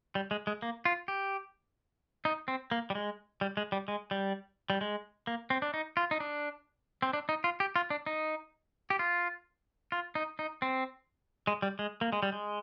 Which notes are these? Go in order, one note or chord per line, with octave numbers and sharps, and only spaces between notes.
G3
G#3
G#3
A#3
F4
G4
D#4
C4
A#3
G3
G#3
G3
G#3
G3
G#3
G3
G3
G#3
A#3
C4
D4
D#4
F4
D#4
D4
C4
D4
D#4
F4
G4
F4
D4
D#4
G4
F4
F4
D#4
D#4
C4
G#3
G3
G#3
A#3
G#3
G3
G#3